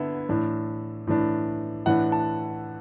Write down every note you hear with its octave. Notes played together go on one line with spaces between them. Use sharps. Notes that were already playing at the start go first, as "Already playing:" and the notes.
Already playing: D3 B3 E4 E5
A2 E3 D4
A2 E3 D4
A2 E3 D4 F#5
A5